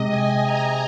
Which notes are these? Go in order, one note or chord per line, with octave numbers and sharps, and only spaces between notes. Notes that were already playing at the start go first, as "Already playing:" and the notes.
Already playing: C3 G#3 D#5
G#5
A#5